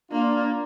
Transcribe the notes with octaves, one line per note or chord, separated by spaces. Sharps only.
A#3 D4 F4